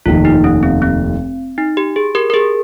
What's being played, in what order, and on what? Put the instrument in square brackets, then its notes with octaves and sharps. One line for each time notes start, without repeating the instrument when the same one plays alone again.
[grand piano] F1 D#2 D#3 [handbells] F4
[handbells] D#4
C#4
C4
C4
D#4
G4
G#4
G4 A#4
A#4
G#4